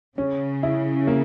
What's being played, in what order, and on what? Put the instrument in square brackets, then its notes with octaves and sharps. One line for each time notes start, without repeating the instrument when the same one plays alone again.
[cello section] C#3 [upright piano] C#4
[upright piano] E4
A#3